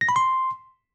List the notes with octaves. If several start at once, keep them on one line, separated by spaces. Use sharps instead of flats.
A#6
B5
C6